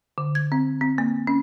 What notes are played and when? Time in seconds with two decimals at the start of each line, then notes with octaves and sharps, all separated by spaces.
0.18 D3
0.35 G#6
0.52 C4
0.81 C4
0.98 A#3
1.27 C#4